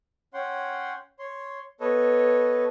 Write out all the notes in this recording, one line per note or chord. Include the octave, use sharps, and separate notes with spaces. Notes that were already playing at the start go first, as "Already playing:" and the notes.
C#4 C#5 F#5 G5 C6
C#5 C6
B3 A4 B4 C#5 D#5